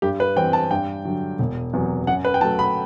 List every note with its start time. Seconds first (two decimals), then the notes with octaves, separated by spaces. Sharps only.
0.02 G2 G4
0.20 B4
0.36 E3 G3 C4 G5
0.53 A5
0.71 G2 G5
1.05 D3 F#3
1.39 E1
1.73 E2 C3 F#3 B3
2.07 F#2 F#5
2.25 B4
2.34 G5
2.41 F#3 A3 A5
2.59 B5